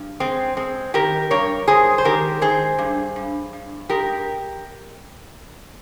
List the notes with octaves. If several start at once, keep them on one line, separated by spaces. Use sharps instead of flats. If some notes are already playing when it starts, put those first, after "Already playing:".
Already playing: G2
G#3 C4
G#3 C4
D#3 G4 A#4
G2 A#4 C#5
G#3 G#4 C5
C5
D#3 G4 A#4
D#3 G#4 C5
G2
G2
G2
G#3 G4 A#4